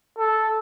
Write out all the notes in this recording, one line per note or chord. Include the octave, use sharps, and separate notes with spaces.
A4